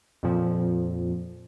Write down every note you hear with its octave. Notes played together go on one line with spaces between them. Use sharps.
F2 A#2 F3